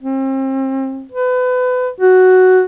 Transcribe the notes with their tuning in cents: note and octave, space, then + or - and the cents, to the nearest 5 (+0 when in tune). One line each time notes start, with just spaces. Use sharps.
C4 +35
B4 +30
F#4 +5